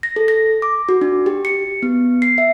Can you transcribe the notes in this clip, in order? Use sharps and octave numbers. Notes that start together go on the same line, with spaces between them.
A#6
A4
A#6
D6
F#4
D4
G4
C#7
B3
C7
E5